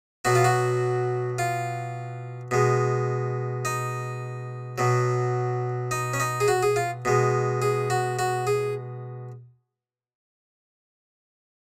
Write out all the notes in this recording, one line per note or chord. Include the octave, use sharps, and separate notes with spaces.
B2 F#3 F#4
F4
F#4
F4
B2 G#3
D#4
B2 F#3
D#4
C#4
D#4
G#4
F#4
G#4
F4
B2 G#3
G#4
F#4
F#4
G#4